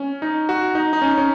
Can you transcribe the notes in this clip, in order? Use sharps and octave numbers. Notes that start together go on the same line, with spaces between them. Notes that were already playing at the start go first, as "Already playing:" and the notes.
Already playing: C#4
D#4
F#4
D#4
D#4
C#4
C#4